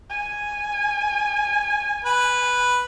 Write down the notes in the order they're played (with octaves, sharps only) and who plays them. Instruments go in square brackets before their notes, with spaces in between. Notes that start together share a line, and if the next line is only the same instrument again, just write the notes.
[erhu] G#5
[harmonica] B4